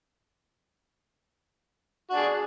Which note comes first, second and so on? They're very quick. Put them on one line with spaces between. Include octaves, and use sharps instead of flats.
F#4 D4 G#4